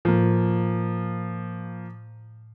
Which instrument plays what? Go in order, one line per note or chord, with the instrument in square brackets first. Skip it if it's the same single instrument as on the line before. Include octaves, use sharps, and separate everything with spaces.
[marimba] A2 [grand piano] F3 A#3